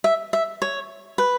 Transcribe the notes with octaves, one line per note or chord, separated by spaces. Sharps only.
E5
E5
C#5
B4